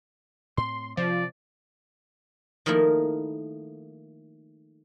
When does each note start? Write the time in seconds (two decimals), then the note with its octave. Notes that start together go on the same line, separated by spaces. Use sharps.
0.57 A2 C4 C6
0.97 C3 F3 D5
2.66 D#3 F3 A3 A#3 E4